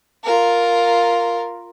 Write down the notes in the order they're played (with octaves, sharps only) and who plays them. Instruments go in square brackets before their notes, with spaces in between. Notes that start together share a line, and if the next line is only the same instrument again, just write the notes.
[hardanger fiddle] F4 A#4